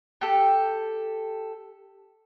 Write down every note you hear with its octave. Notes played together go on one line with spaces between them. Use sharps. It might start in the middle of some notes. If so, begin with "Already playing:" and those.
G4 A4